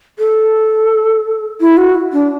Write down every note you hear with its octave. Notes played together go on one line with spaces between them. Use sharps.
A4
E4
F#4
D4